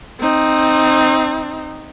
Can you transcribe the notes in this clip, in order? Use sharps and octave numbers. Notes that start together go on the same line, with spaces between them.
C4 D#4